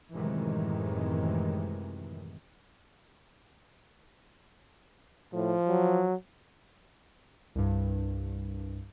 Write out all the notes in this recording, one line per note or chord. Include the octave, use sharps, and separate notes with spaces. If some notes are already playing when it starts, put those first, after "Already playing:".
F#2 A2 C3 D#3 E3 G#3
A2 F3
F#3
C2 G2